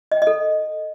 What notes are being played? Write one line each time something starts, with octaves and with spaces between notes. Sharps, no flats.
D#5
G5
D#5
A4